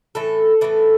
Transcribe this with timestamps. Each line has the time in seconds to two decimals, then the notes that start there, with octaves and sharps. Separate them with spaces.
0.15 A2 E3 A3 A4
0.61 A2 E3 A3